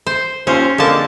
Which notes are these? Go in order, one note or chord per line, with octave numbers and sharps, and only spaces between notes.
C5
D#2 C#4 F4 C5
F2 D3 G#3 A#3 A5